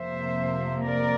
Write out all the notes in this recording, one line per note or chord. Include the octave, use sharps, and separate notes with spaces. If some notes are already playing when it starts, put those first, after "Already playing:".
Already playing: F2 C3 F3 A#3 C5 E5
A#4 D5